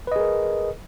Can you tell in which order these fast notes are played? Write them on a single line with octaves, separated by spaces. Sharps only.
B4 D#5 G#4 A#4